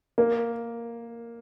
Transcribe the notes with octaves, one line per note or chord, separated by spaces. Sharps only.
A#3